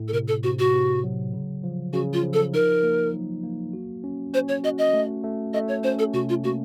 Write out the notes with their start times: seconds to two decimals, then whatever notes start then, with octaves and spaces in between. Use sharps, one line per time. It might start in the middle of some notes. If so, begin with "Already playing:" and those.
Already playing: A2
0.08 A4
0.13 C3 A#4
0.28 A4
0.43 C3 F#4
0.59 F#4
0.73 C3
1.04 F#3
1.33 C#3
1.64 F3
1.93 C#3 F#4
2.13 F4
2.23 F3
2.33 A4
2.53 D#4 A#4
2.83 A#3
3.13 F#3
3.43 A#3
3.73 F#4
4.04 C#4
4.33 C#4 C5
4.48 C#5
4.64 F#4 D#5
4.78 D#5
4.93 A3
5.24 A3
5.54 A3 D#5
5.68 C#5
5.84 C#4 C5
5.99 A4
6.14 C3 F#4
6.29 F4
6.44 A#3 F#4